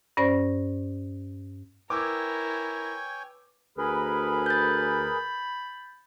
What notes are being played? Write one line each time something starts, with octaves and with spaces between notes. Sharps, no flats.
G2 C#4 C5 D5 A#6
E4 A#4 B4 C#5 G5 G#5 D6 E6
D2 G#4 A#4 B4 B5
G6 A6